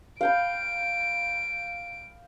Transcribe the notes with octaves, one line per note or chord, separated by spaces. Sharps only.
F5 G5 B5 D7